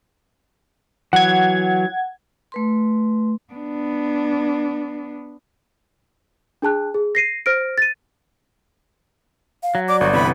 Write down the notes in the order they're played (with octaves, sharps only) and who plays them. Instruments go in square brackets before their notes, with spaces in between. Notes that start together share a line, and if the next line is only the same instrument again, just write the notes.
[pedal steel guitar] E3 F#3 [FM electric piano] F#5 G#6
[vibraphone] A3 B4 C6
[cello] B3 D4
[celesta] D4 G#4 A5 F#6
G#4
A#6 C7 D#7
C5 F6 A#6 D7
A6 D#7
[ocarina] F5
[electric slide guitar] F#3
[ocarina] D5 [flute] D6
[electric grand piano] G1 [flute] F#4
[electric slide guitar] C3 E3 B3 [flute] B5